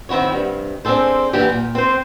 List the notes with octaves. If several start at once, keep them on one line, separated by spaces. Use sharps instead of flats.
D#3 C4 E4 F#4 C#5
G2 C3
C4 D4 G#4 A4 C5
E3 F#3 A#3 C#4 D4 G4
A#2
C4 C5